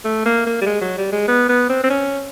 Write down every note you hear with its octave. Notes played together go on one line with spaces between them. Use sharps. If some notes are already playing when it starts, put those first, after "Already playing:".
A3
A#3
A#3
G3
G#3
F#3
G3
G#3
B3
B3
C4
C4
C#4